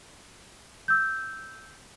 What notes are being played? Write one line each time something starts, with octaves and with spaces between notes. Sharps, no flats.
E6 G6